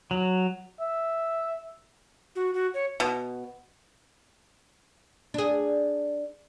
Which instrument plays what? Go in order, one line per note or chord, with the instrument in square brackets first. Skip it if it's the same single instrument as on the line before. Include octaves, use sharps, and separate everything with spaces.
[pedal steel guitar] F#3
[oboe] E5
[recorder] F#4
F#4
C#5
[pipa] B2
[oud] D4 G#4